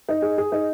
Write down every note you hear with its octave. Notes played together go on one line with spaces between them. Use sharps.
D#4
G#4
G#4
D#4